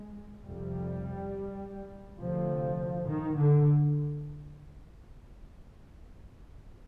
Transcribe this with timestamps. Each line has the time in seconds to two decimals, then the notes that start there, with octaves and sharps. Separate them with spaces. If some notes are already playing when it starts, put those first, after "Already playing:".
Already playing: G#3
0.44 F2 C3 G3
2.20 D2 C3 F3
3.09 D#3
3.38 D3